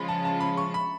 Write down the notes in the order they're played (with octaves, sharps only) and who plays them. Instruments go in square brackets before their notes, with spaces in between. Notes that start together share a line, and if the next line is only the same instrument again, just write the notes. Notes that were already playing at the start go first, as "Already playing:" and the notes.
Already playing: [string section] C#3 F3 G#3 C#4 F4 [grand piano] B5
[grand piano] A5
A5
B5
C#6
B5